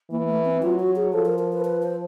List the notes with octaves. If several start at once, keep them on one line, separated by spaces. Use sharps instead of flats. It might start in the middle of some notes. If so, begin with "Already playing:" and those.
E3 A#3
A3
C4
F#3 F4
F#4
G#4
F3 A4
A#4
A#4
B4
B4
C5